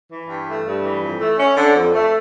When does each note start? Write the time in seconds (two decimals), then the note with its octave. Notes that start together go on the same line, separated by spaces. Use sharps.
0.11 E3
0.29 G2
0.48 A3
0.65 G2
0.83 E3
1.01 F2
1.19 A3
1.38 C#4
1.56 D3
1.75 F2
1.93 A3